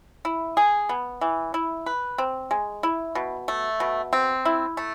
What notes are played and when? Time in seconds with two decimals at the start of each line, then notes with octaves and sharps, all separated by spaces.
0.25 E4
0.57 G#4
0.89 B3
1.21 E3
1.54 E4
1.86 B4
2.18 C4
2.51 G#3
2.83 E4
3.15 B2
3.48 A3
3.80 B2
4.13 C4
4.45 E4
4.77 A3